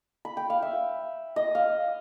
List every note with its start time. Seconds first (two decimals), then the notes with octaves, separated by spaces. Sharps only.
0.25 B5
0.37 G5
0.50 F5
0.62 E5
1.36 D#5
1.55 F5